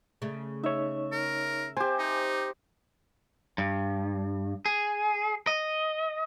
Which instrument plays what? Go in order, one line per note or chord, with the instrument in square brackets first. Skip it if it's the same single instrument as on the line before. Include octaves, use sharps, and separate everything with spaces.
[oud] C#3 A3
[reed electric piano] D#4 C#5 [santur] E5
[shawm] A#4
[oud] C4 [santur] G4 C5 [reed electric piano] G#5
[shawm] D#4
[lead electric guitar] G2
G#4
D#5